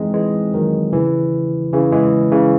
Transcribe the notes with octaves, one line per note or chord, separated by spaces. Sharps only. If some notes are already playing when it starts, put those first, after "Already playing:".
Already playing: E3 G#3 C4 D#4
E3 G#3
D#3 F#3
C#3 E3
C#3 E3
E3 G#3
C#3 E3